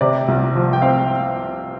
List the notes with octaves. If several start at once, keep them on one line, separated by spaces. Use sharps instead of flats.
C3 D5
C2
F3
G5
C4 F5